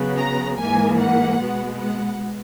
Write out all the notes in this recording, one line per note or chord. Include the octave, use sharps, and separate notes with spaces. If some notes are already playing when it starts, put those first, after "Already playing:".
Already playing: C#3 F#3 B3
A#5
G#2 E3 A#3 G#5
F#5
B2 G#3 B3
F#5